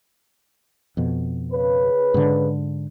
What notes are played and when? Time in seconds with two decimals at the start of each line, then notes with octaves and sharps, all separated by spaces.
0.97 F2 B2
1.52 C#3 B4
2.14 G#2 D3